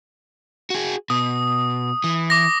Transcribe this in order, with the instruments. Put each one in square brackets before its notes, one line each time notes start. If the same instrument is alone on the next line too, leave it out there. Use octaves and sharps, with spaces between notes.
[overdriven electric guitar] F#4 G#4
[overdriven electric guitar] B2 [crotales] D#6
[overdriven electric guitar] E3
[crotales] D6 A#6